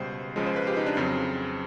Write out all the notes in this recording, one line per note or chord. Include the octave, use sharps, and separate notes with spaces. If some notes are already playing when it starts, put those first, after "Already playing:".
Already playing: C#2 B2 G3 C5
C#2 C#3 F3 G#3
C5
B4
G4
D#4
D4
F2 C#3 F#3 C4